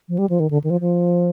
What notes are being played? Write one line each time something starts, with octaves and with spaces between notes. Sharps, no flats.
F3
G3
F3
D#3
D3
D#3
F3
F3